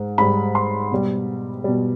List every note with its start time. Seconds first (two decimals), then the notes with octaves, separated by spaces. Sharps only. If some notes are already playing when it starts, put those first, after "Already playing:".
Already playing: G#2
0.18 G#2 G3 B5
0.55 C6
0.91 B2 G3
1.64 B2 G3